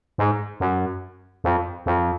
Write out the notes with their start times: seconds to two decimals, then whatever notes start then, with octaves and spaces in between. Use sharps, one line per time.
0.18 G#2
0.60 F#2
1.44 F2
1.86 F2